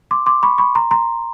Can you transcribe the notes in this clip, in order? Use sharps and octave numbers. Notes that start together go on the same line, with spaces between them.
C6 D6
C6 D6
B5 C#6
B5 C#6
A#5 C6
A#5 C6